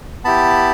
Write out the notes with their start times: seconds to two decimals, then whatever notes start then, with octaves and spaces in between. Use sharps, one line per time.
0.24 B3 E4 G4 A5 B5